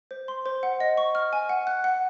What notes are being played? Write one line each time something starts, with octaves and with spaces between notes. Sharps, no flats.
C5
C6
C5
F#5
D#5
C#6
F6
G#5
F#5
F#6
F#5